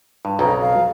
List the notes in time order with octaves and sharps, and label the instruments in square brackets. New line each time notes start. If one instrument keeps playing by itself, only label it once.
[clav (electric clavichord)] G2
[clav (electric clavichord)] B1 F2 C#3 [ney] A#5
[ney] F5